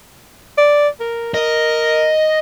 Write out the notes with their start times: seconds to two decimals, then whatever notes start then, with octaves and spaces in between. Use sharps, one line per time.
0.58 D5
1.00 A#4
1.34 A#4 D#5